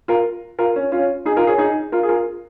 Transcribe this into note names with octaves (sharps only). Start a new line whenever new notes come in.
F4 A#4
F4 A#4
C#4
C#4 F4
D#4 G#4
F4 A#4
G#4 C#5
D#4 G#4
F4 A#4
G#4
F4 A#4